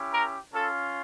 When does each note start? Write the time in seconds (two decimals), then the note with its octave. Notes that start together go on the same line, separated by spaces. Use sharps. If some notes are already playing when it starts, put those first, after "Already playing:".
Already playing: C#4 E4 G4
0.12 A#4
0.52 C#4 F4 A4